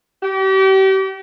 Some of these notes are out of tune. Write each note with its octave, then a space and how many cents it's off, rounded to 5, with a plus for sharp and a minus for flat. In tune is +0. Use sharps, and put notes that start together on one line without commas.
G4 -35